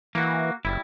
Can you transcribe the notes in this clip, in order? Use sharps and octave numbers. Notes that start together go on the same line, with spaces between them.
E3 A#3 F#4
F#1 G3 E4